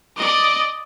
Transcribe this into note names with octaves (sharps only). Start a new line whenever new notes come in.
D5 D#5